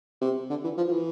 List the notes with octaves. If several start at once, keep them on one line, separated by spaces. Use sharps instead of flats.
C3
D3
E3
F3
F3
E3